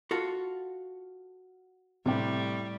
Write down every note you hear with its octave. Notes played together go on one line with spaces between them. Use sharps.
F4 F#4 A4
A2 C3 G3 G5